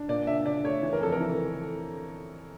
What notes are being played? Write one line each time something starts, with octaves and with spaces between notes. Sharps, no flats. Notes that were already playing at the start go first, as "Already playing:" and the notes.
Already playing: D4
A#2 D5
D4 E5
D4 D5
A3 C#5
E3 C#5
A#4
F2 A4
A#4
E3